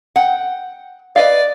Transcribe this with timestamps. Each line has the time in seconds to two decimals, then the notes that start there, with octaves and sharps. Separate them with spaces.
0.16 F#5 G5
1.16 B4 D5 D#5 F5